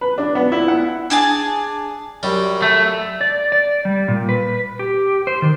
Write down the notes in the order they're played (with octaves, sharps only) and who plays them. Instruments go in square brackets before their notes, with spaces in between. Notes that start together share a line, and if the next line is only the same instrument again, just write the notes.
[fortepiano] B4
D4
B3
E4
F#5
[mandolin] D4 G#4 G#5 A5
[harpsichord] F#2 G3
[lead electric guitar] A3
[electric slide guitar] D5
D5
G3
A#2
B4
G4
C5
D#3